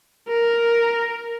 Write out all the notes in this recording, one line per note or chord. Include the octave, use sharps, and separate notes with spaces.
A#4